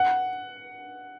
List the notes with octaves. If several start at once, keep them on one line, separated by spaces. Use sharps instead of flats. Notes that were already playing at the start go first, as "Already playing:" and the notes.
Already playing: F#5